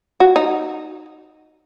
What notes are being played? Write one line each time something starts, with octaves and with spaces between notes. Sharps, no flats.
F#4
D#4